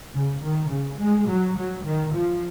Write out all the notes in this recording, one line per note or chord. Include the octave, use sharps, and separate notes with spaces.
C#3
D#3
C#3
G#3
F#3
F#3
D#3
F3